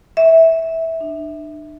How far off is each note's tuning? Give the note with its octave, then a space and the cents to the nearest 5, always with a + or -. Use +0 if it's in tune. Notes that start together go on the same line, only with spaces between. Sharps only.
E5 -15
D4 +45